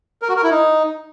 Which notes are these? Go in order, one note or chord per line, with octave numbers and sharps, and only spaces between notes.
A#4
F#4
A#4
E4
D#4